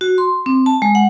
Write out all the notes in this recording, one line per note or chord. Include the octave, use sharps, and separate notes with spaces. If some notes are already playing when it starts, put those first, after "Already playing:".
F#4
C6
C4
A5
G#3
F#5